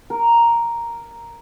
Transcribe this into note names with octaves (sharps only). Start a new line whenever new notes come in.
A#4